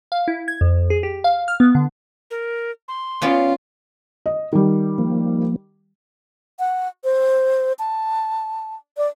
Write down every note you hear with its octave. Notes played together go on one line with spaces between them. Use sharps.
F5
E4
G#6
F2
G#4
G4
F5
F6
B3
D3
A#4
C6
B3 C#4 F4 D5 F5
D#5
D#3 G3
F3 A#3
F#5
C5
A5
D5